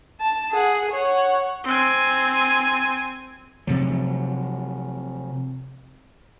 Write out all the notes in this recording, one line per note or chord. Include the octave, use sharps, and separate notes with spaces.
A5
G#4 F#5
C#5 F#5
C4 G#5
C3 F3 F#3